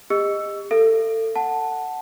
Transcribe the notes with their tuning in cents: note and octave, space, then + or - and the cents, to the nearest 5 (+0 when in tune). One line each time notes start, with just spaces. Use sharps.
G4 +45 D#5 +0 E6 +10
A4 +25 F5 -40
F#5 +0 A5 +0